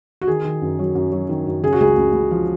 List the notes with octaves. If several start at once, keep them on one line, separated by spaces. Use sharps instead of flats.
F#4
D#3 G#4
D#3
F#2
F#3
F#2
F#3
D#3
F#2
C#3 G#4
F#4
C#2 G#4
C#2
C#2
F3